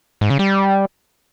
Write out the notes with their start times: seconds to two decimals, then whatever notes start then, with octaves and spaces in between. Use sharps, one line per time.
0.21 G#2
0.30 C#3
0.39 G3